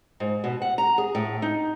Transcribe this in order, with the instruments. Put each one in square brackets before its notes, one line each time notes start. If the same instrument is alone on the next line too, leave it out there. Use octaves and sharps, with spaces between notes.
[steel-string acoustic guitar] G#2
B2
F#5
A#5
G#4
A2
D#4